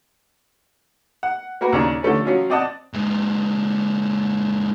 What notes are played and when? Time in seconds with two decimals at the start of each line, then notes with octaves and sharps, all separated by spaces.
1.23 F#5
1.61 A#3 F#4 A#4 B4
1.72 D#2 C#3 D4 A#4
2.03 D3 F3 A3 C#4
2.25 F3 F#3 C#4 F4
2.50 C4 D5 D#5 F#5 A5 F#6
2.93 A#2 G#3